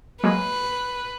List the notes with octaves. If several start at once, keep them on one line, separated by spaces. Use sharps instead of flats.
F#3 G#3 A#3 B4